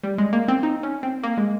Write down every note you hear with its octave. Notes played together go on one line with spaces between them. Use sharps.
G3
G#3
A#3
C4
D#4
C#4
C4
A#3
G#3